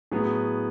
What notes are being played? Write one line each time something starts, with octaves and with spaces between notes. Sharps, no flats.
A2 F#3 B3 G#4